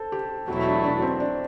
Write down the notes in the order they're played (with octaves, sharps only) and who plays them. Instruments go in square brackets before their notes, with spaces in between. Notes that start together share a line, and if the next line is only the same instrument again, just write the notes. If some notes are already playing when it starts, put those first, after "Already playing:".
Already playing: [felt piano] A4 C5
G4
[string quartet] E2 B2 F#3 A3 E4 [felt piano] F#4
[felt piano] D4
D4
C4
D4